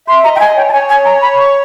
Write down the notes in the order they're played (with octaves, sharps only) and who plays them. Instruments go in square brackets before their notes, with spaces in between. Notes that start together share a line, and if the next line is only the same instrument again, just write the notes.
[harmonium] E5 [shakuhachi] C6
[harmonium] D#5 [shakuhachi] A#5
[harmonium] E5 [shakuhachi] G5
[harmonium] D#5 [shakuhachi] G#5
[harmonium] C#5 [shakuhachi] G5
[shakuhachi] A5
[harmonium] C#5 [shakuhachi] G#5
[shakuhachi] G#5
A#5
B5
C#6